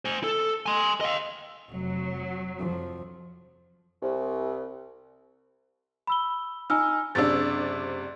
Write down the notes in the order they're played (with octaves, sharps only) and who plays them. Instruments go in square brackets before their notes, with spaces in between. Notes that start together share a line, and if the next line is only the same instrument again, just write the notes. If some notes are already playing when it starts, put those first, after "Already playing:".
[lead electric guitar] C5 G#5
A4
G#5 C6
D#5 F5
[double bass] F1 [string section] F#3
[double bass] F2 F3
[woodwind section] C2
[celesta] B5 E6 G7
[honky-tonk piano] D#4 [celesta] G#5 E6 F6
[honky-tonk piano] F#1 C3 D4 [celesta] E6 A6